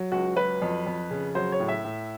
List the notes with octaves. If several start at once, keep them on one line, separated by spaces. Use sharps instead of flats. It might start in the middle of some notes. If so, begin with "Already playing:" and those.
Already playing: F#3
C#2 F#4
F#3 B4
F2
F2
C#3
F#3 C5
C#5
A2
E5
A2